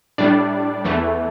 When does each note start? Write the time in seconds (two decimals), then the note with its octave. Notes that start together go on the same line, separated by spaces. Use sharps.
0.18 A2 G3 D4 D5
0.85 E2 E3 A3